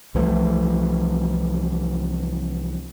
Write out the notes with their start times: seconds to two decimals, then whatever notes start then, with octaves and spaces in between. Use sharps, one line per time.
0.15 C2 E3 F3 A3